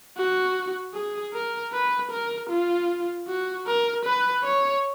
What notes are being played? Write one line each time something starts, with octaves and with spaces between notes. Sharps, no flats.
F#4
G#4
A#4
B4
A#4
F4
F#4
A#4
B4
C#5